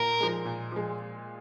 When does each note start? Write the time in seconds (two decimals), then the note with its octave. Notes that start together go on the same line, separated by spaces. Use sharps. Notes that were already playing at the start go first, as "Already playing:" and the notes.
Already playing: A#2 A#4
0.20 F3 G#3
0.45 A#2
0.72 F3 G#3